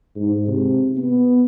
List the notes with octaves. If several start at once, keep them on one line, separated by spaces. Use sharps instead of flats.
G#2
C3
B3